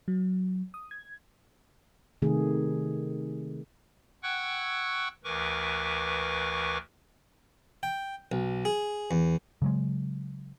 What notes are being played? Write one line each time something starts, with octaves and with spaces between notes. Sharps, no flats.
F#3
D#6
G#6
C3 D#3 A3 G#4
F#5 G5 C#6 E6 F#6 G#6
D2 E3 A#4 B4 C#6 D6
G5
B1
G#4
E2
C#3 F#3 G#3